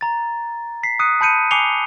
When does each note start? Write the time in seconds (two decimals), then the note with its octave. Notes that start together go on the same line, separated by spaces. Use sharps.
0.01 A#5 A6
0.83 B6 C7
0.99 D#6 F#6 C#7 D#7
1.21 A5 B5 G6 C#7 D#7
1.51 G#5 D6 C7 C#7 F7 G7